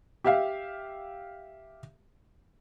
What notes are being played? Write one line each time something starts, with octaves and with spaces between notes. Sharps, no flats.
G4 E5 F5